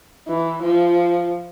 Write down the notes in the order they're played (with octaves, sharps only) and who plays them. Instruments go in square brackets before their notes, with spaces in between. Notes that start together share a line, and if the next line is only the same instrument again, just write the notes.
[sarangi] E3
F3